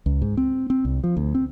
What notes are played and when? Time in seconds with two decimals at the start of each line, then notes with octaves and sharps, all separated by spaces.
0.06 C#2
0.22 G#2
0.37 C4
0.70 C4
0.85 C2
1.04 F3
1.17 D2
1.35 C4